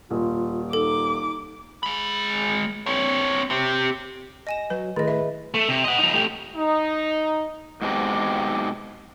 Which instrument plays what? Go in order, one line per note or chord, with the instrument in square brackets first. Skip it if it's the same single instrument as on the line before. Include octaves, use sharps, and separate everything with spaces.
[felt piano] D#1 [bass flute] F4
[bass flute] D#4 [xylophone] A4 [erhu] D6
[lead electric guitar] G#3 B5
C4 C#5
C4 G4
[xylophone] D#5 G#5 E7 [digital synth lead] A#6
[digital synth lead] F#3 [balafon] B4
[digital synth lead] A2 [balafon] D#3 [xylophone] G#4 D#5 [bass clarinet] B4
[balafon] E5
[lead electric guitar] A3
C3
D#5 F#5
F3 D#4
A3 G4
[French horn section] D#4
[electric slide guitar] G#2 B2 G#3 C4 G4